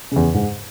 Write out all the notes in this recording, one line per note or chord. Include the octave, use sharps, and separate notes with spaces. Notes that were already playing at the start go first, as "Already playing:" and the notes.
E2 C#3
G#2